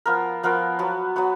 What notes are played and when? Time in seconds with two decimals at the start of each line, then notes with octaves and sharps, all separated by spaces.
0.06 F3 B3 F4 A#4
0.43 F3 B3 F4 A#4
0.79 F#3 B3 F#4
1.16 F#3 B3 F#4